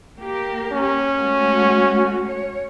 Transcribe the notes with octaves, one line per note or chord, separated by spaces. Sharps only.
A#3 G4 A#4
C#4
G#3 A3 F#4
C#5